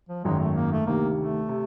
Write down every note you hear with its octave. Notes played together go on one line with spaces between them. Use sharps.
F3
G#1 F#2 D#3 F#3 G#3
A3
A#3
A3
D2 C3 D#3 A#3
A3
C3